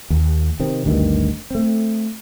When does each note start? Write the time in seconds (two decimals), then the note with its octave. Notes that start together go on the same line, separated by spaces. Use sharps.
0.10 D#2
0.60 C3 D#3 C4
0.85 G#1 D2 G2 D#3
1.50 A3 C4